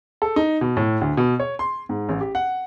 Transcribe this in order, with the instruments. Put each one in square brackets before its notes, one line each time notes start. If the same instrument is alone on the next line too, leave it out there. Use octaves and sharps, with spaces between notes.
[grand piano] A4
D#4
B2
A2
D2
B2
C#5
C6
G#2
A1
G4
F#5